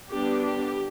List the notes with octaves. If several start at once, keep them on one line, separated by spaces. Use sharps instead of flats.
D3 G3 B3 D4 G4
G4